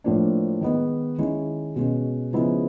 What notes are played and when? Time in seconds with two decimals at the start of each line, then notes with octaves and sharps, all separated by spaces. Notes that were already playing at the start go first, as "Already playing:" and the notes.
0.04 A2 F3 A#3 D4
0.61 D#3 G#3 B3
1.18 D#3 G#3 C#4 E4
1.76 B2 G#3 C#4
2.33 C#3 F3 G#3 B3 E4